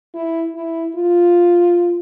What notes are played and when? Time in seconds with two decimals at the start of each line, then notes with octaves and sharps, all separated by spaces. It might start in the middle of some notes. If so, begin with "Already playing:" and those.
0.15 E4
0.56 E4
0.95 F4